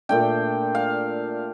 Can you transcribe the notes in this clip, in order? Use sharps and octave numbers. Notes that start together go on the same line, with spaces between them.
A#2 A3 D4 G5
F5